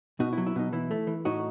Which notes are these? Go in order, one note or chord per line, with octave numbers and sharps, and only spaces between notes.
B2 D#4 F#4
E4
F#3
E4
B2 D#4
E3 E4
A3
E3
A2 D#4 F#4